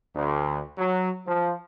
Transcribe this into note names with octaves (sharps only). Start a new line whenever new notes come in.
D2
F#3
F3